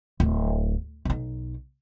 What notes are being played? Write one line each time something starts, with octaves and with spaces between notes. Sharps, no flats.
D1
B1 D#4